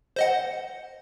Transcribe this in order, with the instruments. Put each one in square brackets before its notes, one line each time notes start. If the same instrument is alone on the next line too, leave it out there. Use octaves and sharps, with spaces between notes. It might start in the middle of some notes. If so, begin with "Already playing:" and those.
[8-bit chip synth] C5 D#5 F#5